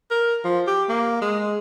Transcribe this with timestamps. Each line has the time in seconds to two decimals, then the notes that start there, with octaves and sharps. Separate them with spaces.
0.11 A#4
0.44 F3
0.67 G4
0.89 A#3
1.21 G#3